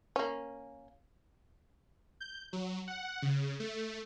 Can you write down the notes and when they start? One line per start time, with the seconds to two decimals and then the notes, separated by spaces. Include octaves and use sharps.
0.16 A#3 C#4
2.20 G6
2.53 F#3
2.88 F#5
3.22 C#3
3.60 A3